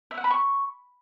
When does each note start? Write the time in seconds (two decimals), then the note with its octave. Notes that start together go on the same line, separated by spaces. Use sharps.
0.11 E5
0.17 F#5
0.24 B5
0.31 C#6